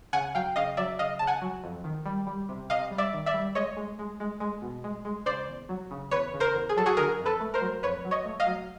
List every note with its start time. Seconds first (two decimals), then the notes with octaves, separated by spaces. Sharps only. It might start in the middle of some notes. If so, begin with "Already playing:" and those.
0.13 C#3 F#5 G#5
0.35 F#3 F5 G5
0.56 C#3 D#5 F5
0.77 F#3 D5 E5
0.99 C#3 D#5 F5
1.19 C#3 A5
1.27 F#5 G#5
1.42 F#3
1.64 F2
1.84 D#3
2.06 G3
2.27 G3
2.49 C3
2.70 C3 D#5 F5
2.91 G3
2.98 D5 E5
3.13 D#3
3.26 D5 E5
3.34 G3
3.55 G#3 C#5 D#5
3.77 G#3
3.99 G#3
4.20 G#3
4.40 G#3
4.62 B2
4.84 G#3
5.05 G#3
5.26 C#3 C5 D5
5.48 E2
5.69 F#3
5.91 C#3
6.11 E2 B4 C#5
6.34 C#3
6.40 A#4 C5
6.54 E2
6.69 G#4
6.77 F#3 A4
6.86 F#4 G#4
6.97 D3 G#4 A#4
7.19 F2
7.25 A4 B4
7.40 A3
7.54 A#4 C5
7.61 F#3
7.83 F2 B4 C#5
8.05 F#3
8.11 C#5 D#5
8.25 A3
8.40 D#5 F5
8.46 F#3